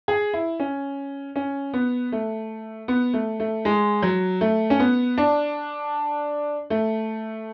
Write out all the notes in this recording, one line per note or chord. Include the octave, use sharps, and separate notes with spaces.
G#4
E4
C#4
C#4
B3
A3
B3
A3
A3
G#3
F#3
A3
C#4
B3
D4
A3